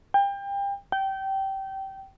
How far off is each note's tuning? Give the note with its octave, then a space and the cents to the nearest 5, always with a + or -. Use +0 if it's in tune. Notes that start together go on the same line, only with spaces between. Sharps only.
G5 +30
G5 -20